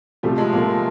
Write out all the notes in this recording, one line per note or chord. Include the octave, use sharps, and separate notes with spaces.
C3 F3 G3 A3
G#3
C3 F3 A3 A#3